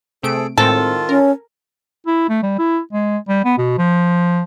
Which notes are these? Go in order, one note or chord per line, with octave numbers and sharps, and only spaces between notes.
C3 A3 G#4 A4 D7
A2 D#3 G#3 C4 F4 A4
C#4 A#4
E4
A3
G3
E4
G#3
G3
B3
B2
F3